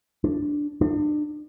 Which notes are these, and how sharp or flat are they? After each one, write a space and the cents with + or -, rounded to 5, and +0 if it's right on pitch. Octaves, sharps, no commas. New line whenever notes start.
D4 +0
D4 +35